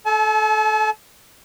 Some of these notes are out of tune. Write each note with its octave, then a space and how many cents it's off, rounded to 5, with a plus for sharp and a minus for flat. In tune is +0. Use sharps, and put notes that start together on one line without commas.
A4 -20 A5 -45